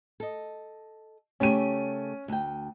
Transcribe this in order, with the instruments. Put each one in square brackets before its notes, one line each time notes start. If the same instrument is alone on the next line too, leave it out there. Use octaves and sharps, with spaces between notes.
[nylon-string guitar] A4 D#5
[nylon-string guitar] C#3 A3 G4 [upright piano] C#4 D#7
[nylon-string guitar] D2 G5